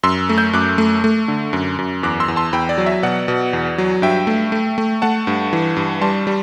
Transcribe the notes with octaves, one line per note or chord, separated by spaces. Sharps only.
F#2 C6 E6
A3
E6 G6
F#2 D6 F#6
A3
A3
D3
F#2
F#2
E2 D6 F#6
C6 E6
E2
A5 C6
E2 G5 B5
D5
F#3
E5
B2 D5 F#5
B2
E2
F#3
G2 E5 G5
A3
A3
A3
A3 F#5 A5
G2
E3
G2
G3 A5 C6
G3